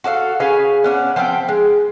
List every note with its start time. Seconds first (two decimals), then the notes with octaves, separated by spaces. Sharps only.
0.04 F#4 A4 D5 F5
0.40 C#4 G#4 B4 F5
0.84 B3 C#4 D4
1.16 F3 B3 C4 G5
1.49 G#3